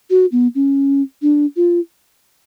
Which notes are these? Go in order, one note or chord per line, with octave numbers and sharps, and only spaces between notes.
F#4
B3
C#4
D4
F4